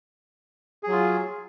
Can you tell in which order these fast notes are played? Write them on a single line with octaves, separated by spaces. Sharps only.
G#4 F#3 F4